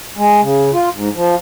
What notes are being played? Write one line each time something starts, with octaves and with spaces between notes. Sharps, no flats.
G#3
C#3
F4
G#2
F3